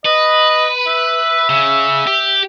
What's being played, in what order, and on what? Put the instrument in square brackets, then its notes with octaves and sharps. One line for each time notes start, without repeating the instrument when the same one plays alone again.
[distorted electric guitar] B4 [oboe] D#5
[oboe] E5
[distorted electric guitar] C#3
G4